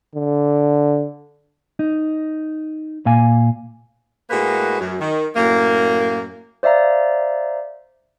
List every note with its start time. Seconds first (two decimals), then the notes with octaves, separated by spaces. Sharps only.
0.15 D3
1.79 D#4
3.06 A#2 F5 G#5
4.30 A2 G#3 A#3 F#4 B4
4.80 F#2
5.00 D#3
5.36 F#2 A2 A#3
6.63 C5 D5 E5 F5 A#5